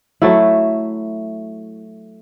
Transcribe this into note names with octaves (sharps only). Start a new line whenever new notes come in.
F#3 A3 E4